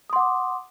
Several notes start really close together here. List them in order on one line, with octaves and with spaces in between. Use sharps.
D#6 C6 F#5 D6